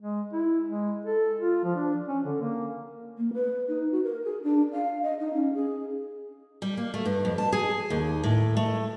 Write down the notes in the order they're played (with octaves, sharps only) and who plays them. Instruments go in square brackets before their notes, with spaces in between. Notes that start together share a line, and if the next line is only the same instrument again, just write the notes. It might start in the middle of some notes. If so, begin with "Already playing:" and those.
[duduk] G#3
E4
G#3
A4
F4
F3
D4
C#4
D3
A#3
[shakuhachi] A#3
B4
D#4
F#4
A#4
G#4
D4
F5
D#5
D#4
C#4
G#4
[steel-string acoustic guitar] G3
A#3
A3
G2
F2
A5
G#4
D#2
A2
A3